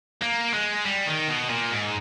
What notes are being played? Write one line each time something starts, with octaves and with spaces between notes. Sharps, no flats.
A#3
G#3
G3
D#3
B2
A#2
G#2